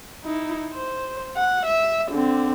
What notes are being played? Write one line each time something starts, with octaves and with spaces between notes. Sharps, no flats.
D#4 E4
C5
F#5
E5
D3 C4